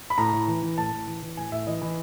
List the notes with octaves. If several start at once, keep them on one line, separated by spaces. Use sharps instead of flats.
B5
A2 A#5
A2
E3
E3
A2 A5
A2
E3
E3
A2 G#5
A2 E5
E3 D#5
E3